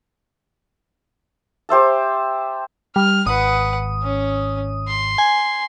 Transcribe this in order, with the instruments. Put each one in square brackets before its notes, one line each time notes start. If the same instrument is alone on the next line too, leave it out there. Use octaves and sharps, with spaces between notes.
[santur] G4 C5 E5 A5
[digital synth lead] G3 [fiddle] F6
[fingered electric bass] G#1 [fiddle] B4 F#5 [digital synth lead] D#6
[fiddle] C#4
C6
[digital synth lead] G#5